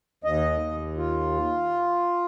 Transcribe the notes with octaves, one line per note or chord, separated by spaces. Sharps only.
D#2 D#5
D#2
F4